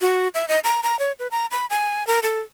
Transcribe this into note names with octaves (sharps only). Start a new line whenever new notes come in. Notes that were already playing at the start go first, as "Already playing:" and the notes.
F#4
E5
D#5
A#5
A#5
C#5
B4
A#5
B5
G#5
A#4
A4